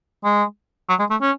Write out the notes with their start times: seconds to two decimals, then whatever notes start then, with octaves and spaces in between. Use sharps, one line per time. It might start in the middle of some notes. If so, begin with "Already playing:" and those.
0.24 G#3
0.89 F#3
0.99 G#3
1.10 A3
1.21 C#4